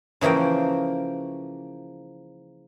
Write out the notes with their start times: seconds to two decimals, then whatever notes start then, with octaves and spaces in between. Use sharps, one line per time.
0.21 C#3 E3 F3 A#3 G5